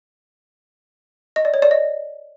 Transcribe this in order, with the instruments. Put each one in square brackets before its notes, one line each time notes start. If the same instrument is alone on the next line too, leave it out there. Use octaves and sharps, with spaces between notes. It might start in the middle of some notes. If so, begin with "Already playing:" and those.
[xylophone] D#5
D5
C#5
D5
D#5